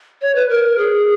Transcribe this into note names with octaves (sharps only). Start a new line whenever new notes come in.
C#5
B4
A#4
G#4